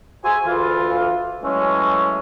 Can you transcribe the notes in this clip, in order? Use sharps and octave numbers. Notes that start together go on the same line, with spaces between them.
F#4 G#4 C5 E5 G#5
D2 E3 F4
E3 F#3 G#3 A3 C#4